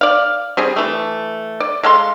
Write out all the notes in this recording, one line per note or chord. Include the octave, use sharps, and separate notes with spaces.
D5 F5
G3 C4 G#4
E3 A3
D5
G#3 A4 F5 C6